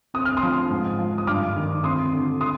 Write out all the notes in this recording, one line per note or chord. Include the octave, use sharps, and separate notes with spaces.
C4 D#6
F6
C6 D#6
F3
G#2
F3
D#6
G2 D6 F6
D#3
C4 C6 D#6
D3
C6 D#6